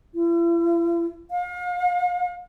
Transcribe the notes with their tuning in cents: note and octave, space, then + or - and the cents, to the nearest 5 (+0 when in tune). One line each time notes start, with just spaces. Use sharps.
E4 +45
F5 +40